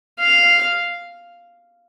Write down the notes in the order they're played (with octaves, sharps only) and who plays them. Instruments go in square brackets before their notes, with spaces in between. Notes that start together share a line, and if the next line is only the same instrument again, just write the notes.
[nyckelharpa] F5